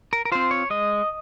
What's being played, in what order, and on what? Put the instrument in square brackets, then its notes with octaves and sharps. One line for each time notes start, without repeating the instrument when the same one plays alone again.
[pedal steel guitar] A#4
A#4
C4 F4 C5
C#5
G#3 D#5